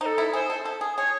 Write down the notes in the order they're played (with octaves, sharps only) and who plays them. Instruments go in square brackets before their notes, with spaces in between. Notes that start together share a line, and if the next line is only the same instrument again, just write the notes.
[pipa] D#4 [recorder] C5
[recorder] A4
[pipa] E4
[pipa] G#4 [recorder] C5
[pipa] A4
A4
G#4
[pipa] G#4 [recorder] C#5